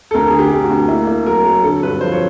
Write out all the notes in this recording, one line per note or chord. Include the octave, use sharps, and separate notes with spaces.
A4
D2 A#4
D3 G#4
G4
D2
F#4
D2
A#3 E4
A#3
F#3 A#4
F#3 A#4
D3 A4
G2 B4
F3 C5
C#5